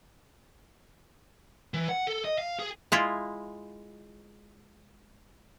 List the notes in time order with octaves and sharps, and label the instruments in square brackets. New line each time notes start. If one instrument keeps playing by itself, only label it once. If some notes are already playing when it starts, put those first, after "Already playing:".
[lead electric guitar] E3
F#5
A4
D#5
F5
G#4
[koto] G#3 E4 F4